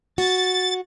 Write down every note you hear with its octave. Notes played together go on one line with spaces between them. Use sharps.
F#4 A6